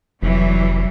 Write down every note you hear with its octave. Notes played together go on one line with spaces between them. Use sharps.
F1 E3 F#3 G3